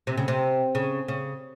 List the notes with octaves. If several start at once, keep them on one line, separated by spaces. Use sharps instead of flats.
C3
C#3
C3
C#3
C#3